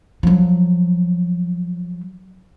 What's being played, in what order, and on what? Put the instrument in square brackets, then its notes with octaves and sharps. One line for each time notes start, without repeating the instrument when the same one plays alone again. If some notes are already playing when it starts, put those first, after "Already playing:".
[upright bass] F3 F#3